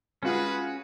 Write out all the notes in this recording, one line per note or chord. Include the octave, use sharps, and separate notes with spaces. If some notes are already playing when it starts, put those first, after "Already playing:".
G#3 C#4 F4 F#4 G#4 B4 F#5